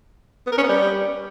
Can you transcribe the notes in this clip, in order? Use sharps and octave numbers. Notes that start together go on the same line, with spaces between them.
B3
A#4
C#4
B3
G3